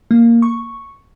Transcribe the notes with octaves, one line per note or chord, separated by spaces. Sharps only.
A#3
C#6